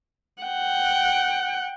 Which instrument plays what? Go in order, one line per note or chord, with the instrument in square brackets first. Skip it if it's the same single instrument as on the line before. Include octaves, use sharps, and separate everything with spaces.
[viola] F#5 G5